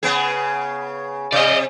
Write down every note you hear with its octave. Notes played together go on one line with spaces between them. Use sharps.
C#3 B3 G#4
C3 D5 D#5